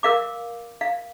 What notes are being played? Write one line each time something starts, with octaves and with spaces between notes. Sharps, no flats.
A#4 F5 D6
F5